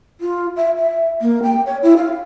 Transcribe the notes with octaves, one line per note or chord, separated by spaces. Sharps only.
F4
E5
E5
A#3
G5
C#5
E4
F5